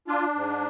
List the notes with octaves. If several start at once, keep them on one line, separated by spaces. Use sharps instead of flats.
D4 F4
G#2